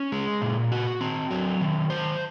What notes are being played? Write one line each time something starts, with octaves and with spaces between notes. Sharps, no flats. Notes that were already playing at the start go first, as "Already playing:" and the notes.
Already playing: C#4
G#3
A#2
F#4
C4
F#3
D#3
C5